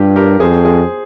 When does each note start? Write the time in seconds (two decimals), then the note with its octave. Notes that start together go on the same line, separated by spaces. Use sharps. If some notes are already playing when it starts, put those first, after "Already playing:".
Already playing: G2 F4 G4
0.16 G4 A#4
0.40 F2 G#4 C5
0.64 G#4 C5